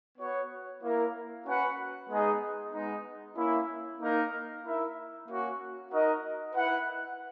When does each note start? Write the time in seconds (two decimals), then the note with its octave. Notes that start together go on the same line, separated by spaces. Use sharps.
0.18 B3 F#4 C#5
0.82 A#3 E4 A#4
1.46 C#4 F#4 B4 F#5
2.09 G#3 B3 D#4 G#4 D#5
2.73 G#3 B3 D#4
3.36 A#3 C#4 E4
4.00 A#3 D#4 A#4
4.64 E4 A#4 E5
5.27 A#3 C#4 F#4
5.91 D#4 F#4 A#4 D#5
6.54 E4 B4 F#5